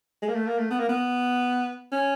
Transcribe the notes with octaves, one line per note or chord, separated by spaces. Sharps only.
G#3
A#3
A3
A#3
A3
B3
A#3
B3
C#4